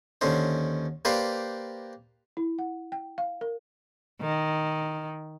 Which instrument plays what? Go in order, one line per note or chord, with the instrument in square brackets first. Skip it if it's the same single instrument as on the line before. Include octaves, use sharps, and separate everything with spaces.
[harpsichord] D#2 D3 C#4 C5
A#3 G4 B4 C5 D5 F5
[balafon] E4
F#5
G5
F5
A#4
[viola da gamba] D#3